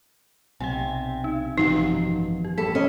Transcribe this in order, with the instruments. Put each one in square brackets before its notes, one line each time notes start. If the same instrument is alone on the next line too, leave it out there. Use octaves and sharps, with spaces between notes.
[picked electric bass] B1 [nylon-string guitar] C3 [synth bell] G5 G#5
[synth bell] D#4
[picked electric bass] G#1 F#2 B2 [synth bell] E3 F3 [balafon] D#4
[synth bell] G4
[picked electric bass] A2 G3 A#3 [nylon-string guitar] A4 [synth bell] B6
[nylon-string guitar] C#4 D#5